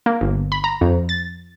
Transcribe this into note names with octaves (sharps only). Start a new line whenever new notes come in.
A#3
G1
B5
A#5
F2
A6